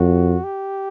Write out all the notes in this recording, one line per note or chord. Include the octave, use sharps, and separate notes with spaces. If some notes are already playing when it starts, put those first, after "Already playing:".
Already playing: F2 F#4
G4